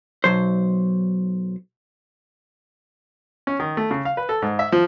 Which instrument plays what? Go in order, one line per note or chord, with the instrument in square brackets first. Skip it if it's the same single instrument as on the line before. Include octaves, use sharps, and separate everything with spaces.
[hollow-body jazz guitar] B1 F#3 C5
[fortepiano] C#4
D#3
A3
C#3
F5
B4
A4
G#2
E5
F3